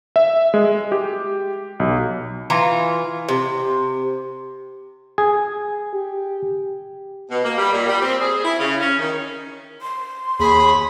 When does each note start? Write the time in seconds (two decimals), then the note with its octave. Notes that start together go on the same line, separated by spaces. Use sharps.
0.16 E5
0.54 G#3
0.92 G4
1.80 B1
2.50 E3 F4 A#5
3.29 C3
5.18 G#4
5.94 G4
7.30 B2
7.44 A#3
7.58 G3
7.72 A#2
7.87 G3
8.02 C4
8.21 G#4
8.44 E4
8.58 C#3
8.80 C#4
8.99 D#3
9.82 C6
10.40 D#2 G#4 B5